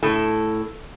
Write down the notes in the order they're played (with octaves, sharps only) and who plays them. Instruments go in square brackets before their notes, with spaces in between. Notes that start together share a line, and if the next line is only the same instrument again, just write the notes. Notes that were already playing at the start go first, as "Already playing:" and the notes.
[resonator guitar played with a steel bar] A2 A4